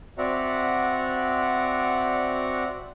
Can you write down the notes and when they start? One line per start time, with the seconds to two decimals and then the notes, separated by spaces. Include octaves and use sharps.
0.18 C4 F#4 D5 E5 F#5 A#5